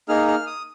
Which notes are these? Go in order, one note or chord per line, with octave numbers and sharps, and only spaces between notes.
A#3 D#4 G#4 F6
F6
D#6